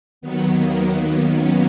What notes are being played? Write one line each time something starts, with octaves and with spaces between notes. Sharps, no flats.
D#2 D#3 F#3 B3
A#3
B3
B3
C#4